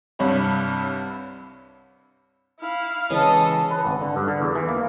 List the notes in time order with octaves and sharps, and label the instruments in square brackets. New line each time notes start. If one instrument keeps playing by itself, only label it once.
[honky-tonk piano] C2 G2 C3 C#5 B5
[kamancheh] E4 F5
[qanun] C#3 E3 G#3 [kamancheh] A4 D#5
[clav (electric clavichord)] B4
G#1
D3
G2
D3
E2
E3
A#3